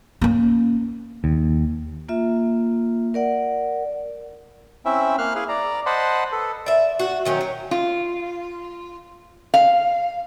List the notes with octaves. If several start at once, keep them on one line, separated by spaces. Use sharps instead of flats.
A#3 C#4
D#2
A#3 F4 E5
A#4 D5 F#5
C4 C#4 E4 E5
A#3 F5 F6 F#6
E4 G#4 F5
D5 A#5
C5 D#5 F#5 A5 B5 C6
A4 B4
D5 E5
F#4
D#3 F#3 C#4
F#3
F4
F5